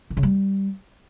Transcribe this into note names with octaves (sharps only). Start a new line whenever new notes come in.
D3
C#3
G3